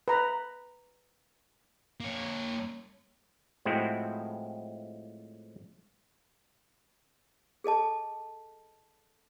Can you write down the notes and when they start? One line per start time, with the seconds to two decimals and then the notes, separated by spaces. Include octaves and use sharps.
0.08 B4 A#5 B5
2.01 A#3 C#5
3.65 A2 F3 G#3 C4 E4 F#4
7.64 G#4 A4 D#5 A5